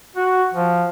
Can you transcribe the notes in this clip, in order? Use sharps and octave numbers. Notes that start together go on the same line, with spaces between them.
F#4
F3